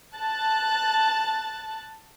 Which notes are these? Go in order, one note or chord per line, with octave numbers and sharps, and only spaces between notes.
A5 F#6 A6